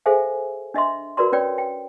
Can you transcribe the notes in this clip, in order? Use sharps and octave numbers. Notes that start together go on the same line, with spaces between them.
G#4 A4 C5 E5 F5 G#5
D4 D#5 E5 C6
F#4 A#4 B4 D5 A#5 C6
C#4 B4 C#5 D5 G5
G5